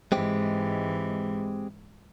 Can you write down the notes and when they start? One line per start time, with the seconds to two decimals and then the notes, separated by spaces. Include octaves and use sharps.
0.12 G#2 E3 G#3 C4 G4